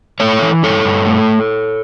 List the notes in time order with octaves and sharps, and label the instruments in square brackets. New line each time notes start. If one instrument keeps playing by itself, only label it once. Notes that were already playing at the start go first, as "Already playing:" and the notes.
[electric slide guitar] A3 A4 C#5
E3
G2 A4 C#5
G2
A3